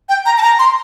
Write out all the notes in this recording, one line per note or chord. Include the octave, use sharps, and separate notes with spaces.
G5
A#5
A5
A#5
C6